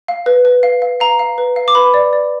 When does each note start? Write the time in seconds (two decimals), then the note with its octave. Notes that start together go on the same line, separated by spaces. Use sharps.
0.08 F5
0.26 B4
0.45 B4
0.63 F5
0.82 F5
1.00 F5 A#5
1.19 F5
1.38 B4
1.56 F5
1.68 D6
1.75 B4 B5
1.94 D5
2.13 D5